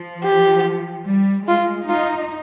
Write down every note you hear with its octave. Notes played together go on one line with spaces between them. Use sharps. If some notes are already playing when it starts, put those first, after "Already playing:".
Already playing: F3
G4
G3
G#3 F4
D#4 F4